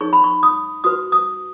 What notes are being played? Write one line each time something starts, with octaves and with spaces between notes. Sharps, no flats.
D#4 G#4 C#5 C#6
B5
C#6
D#6
F#4 B4 D#6
D#6